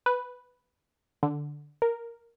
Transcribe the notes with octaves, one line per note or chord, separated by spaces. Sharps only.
B4
D3
A#4